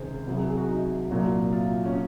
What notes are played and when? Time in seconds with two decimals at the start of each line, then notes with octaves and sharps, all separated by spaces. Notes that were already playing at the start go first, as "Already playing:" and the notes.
Already playing: C#2 C3 D#3 G#4 C5
0.27 C2 C3 F#3
0.36 G#4
0.48 G#4
0.58 F#4
0.69 D#4
1.11 C2 A#2 F#3
1.52 F4
1.85 C#4